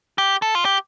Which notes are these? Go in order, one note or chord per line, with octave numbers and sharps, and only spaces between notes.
G4
A4
F4
G4